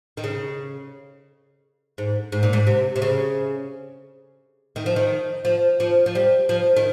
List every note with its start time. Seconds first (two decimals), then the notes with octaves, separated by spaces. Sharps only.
0.17 D#3
0.24 C#3
1.98 G#2
2.32 G#2
2.43 A#2
2.53 G#2
2.67 C3
2.96 C3
3.02 C#3
4.76 D#3
4.86 F3
4.96 D#3
5.45 F3
5.80 F3
6.06 F3
6.15 G3
6.49 F3
6.77 D#3